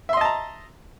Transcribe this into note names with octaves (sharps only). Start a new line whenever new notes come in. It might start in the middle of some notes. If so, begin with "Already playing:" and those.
D#5 E5 A5 A#5 C6